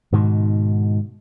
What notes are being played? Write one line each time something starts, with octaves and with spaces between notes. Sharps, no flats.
G#2 B2 D#3